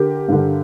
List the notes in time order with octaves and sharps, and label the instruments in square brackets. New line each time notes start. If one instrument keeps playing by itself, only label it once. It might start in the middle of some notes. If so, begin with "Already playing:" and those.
Already playing: [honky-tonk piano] D3 G4 A#4
G2 D3